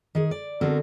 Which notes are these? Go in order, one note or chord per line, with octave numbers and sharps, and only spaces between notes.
D#3 G#4
D5
D3 B3 C4 F#4 A4 A#4